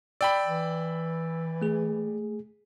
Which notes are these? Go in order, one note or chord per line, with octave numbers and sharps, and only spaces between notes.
D5 G5 B5 E6
E3
A3 G#4